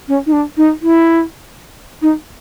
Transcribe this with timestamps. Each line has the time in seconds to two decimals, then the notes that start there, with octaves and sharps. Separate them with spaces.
0.08 C#4
0.26 D#4
0.32 D4
0.57 D#4
0.82 E4
2.02 D#4